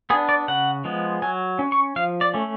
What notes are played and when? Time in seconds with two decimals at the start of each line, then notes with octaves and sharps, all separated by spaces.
0.10 B3 G#4
0.13 D4
0.29 D5
0.48 C#3 F#5
0.85 F3 G#3 B3
1.22 F#3 G#5
1.59 C#4
1.72 C#6
1.96 F3 F5
2.21 D5
2.34 A3 C#4